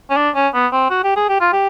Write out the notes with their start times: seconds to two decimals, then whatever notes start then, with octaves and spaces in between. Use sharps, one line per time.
0.10 C#4
0.17 D4
0.35 C#4
0.54 B3
0.72 C4
0.90 F#4
1.04 G4
1.16 G#4
1.29 G4
1.41 F4
1.53 G4